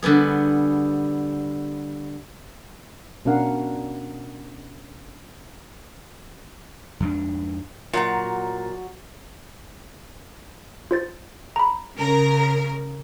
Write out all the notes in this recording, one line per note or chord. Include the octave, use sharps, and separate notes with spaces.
D3 G3 B3 G#4
B2 C#4 D4 A#4 F5 F#5
F2 G#2 D4
A#2 F#3 F#4 A#5
F4 C5 A6
A#5 B5
C#3 A#4